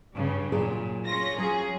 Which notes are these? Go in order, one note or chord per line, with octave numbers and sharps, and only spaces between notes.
G2 C#3
A#2 F#3 G#4 D5
C#4 F4 A#6
F#3 G#4